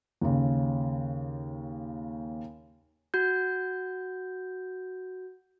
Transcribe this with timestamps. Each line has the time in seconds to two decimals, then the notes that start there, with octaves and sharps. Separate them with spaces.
0.21 D#2 C#3
3.14 F#4 G6